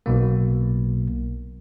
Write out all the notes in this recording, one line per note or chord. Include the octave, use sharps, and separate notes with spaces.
B1 B2 A#3